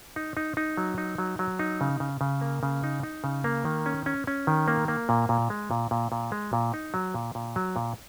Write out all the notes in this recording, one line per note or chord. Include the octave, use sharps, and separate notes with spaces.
D#4
D#4
D#4
F#3
D#4
F#3
F#3
D#4
C#3
C#3
C#3
A#3
C#3
D#4
D#4
C#3
A#3
D#3
C#4
C#4
C#4
D#3
A#3
A#3
A#2
A#2
G#3
A#2
A#2
A#2
G#3
A#2
D#4
F#3
A#2
A#2
F#3
A#2